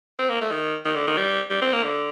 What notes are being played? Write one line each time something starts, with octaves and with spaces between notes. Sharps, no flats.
C4
A#3
A3
D#3
D#3
D3
D#3
G3
G3
C4
A#3
D3